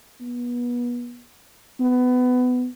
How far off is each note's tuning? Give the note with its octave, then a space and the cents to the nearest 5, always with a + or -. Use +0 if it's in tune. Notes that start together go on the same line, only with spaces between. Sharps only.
B3 -30
B3 +20